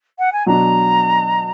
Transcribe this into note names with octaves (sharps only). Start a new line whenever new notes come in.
F#5
G#5
B2 F#3 D4 A#5